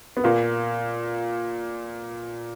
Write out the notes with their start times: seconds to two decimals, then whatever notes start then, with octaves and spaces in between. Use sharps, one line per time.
0.17 B3
0.24 A#2 A#3